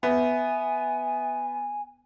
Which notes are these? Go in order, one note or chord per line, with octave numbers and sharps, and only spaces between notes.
B3 E5 G#5